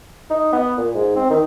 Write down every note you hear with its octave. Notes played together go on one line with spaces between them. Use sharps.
D#4
B3
A#2
G#2
C4
D#3